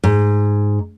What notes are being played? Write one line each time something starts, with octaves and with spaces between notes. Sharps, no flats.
G#2